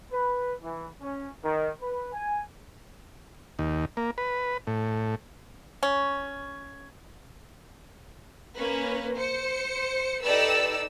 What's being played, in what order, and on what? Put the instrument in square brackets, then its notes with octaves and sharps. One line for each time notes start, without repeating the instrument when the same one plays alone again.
[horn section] B4
E3
C#4
D#3
B4
G#5
[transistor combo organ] D#2
A#3
B4
A2
[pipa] C#4
[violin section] A#3 C#4 B4
C5 C#7
D#4 G4 A4 B4 D5 E6